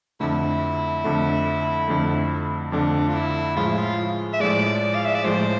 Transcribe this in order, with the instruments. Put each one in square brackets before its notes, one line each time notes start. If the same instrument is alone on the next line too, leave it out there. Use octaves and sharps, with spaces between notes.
[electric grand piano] F2 D3 A3 [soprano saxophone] E4
[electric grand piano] F2 D3 A3
F2 D3 A3
[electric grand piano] F2 D3 A3 [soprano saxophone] D4
[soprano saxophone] F4
E4
[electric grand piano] A2 F3 G#3 [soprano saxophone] F4
[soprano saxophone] E4
F4
E5
[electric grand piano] A2 F3 G#3 [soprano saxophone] D5
[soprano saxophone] F5
E5
D5
[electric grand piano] A2 F3 G#3 [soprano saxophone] C5